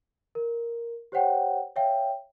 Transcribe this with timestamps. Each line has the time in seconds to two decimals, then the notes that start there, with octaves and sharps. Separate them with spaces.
0.35 A#4
1.12 G4 C5 C#5 F#5 G5
1.76 C#5 E5 F5 G5